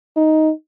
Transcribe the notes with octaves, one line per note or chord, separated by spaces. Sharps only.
D#4